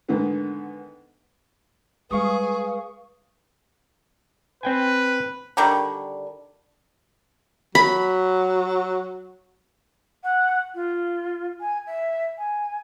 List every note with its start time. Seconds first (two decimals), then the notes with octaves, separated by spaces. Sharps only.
0.09 G#2 D3 D#3 B3
2.11 G3 G#3 G#4 B4 F5 C#6 D#6
4.63 C4 B4 G5 G#5
5.57 D3 D#3 G3 C#6
7.75 F#3 B5
10.23 F#5
10.74 F4
11.60 G#5
11.86 E5
12.38 G#5